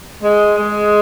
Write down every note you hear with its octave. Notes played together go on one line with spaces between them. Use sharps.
G#3
G#3